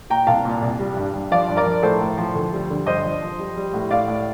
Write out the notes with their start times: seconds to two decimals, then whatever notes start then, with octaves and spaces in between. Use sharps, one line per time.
0.10 A#2 G5 A#5
0.27 C2 F5 A5
0.45 A#2
0.62 C2
0.79 G3
0.97 G2
1.14 G2
1.32 F3 D5 F5
1.48 G2
1.57 A#4 D5
1.66 F3
1.83 A2 A4 C5
2.01 A2
2.18 F3
2.35 D2
2.53 G3
2.70 D3
2.86 G2 C5 D#5
3.04 F3
3.22 F3
3.39 G3
3.56 G3
3.74 A2
3.91 A2 D5 F5
4.08 A2